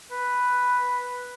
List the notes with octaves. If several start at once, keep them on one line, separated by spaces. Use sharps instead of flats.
B4